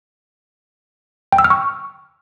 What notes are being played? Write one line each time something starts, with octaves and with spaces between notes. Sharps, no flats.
G5
E6
F6
C#6